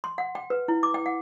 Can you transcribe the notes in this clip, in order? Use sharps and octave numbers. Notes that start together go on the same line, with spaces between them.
C6
F#5
G5
B4
E4
D6
G5
F#5